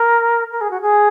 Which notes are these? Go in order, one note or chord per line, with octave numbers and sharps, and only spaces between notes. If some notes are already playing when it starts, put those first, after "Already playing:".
Already playing: A#4
A#4
G#4
F#4
G#4